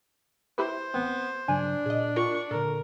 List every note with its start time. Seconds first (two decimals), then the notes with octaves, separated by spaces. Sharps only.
0.58 E4 G4 B4 C5
0.94 A1 B3 C4
1.48 G2 C#3 F#3 D4 G#5
1.86 A#2 G#4 D#5
2.16 F4 A#4 G5 C#6
2.51 A#2 D3 A4 A#4